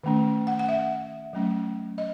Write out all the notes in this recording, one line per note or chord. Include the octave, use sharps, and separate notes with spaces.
D#3 A3 C#4
F#5
F#5
E5
F#3 A3 C#4
D#5